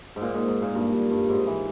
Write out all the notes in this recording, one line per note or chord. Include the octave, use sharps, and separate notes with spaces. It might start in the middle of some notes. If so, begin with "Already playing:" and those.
G#2
A#2
G#2
G#2
A#2
G2
G2
G2
G#2
E3